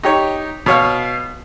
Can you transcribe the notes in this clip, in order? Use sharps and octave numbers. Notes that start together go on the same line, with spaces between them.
D#4 G4 C#5
B2 C#5 F5